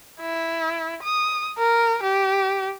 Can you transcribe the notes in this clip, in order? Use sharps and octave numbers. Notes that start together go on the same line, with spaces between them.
E4
D#6
A#4
G4